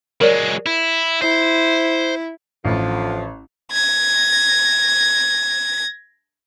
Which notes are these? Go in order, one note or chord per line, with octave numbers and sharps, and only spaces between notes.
F#3 G#3 A#4 C#5 D5
E4
E4 C5
A1 D3 F3
G#6 A#6